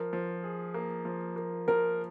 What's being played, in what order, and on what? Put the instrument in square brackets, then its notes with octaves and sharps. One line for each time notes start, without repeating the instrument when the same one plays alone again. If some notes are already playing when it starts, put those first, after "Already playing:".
Already playing: [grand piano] F3 [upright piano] A#4
[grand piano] F3
G#4
A#3
F3
A#3
[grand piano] F3 [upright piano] A#4